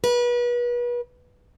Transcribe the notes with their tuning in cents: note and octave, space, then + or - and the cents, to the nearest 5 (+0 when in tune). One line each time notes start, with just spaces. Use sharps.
B4 -35